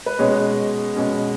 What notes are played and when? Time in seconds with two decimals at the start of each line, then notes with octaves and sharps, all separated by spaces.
0.06 B4
0.19 B2 G#3 C#4 C#5
0.96 B2 G#3 C#4